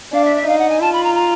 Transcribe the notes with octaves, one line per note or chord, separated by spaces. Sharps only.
D4 F5
E5
E5
D#4 F5
F#5
G#5
F4 A5
B5
A#5
A#5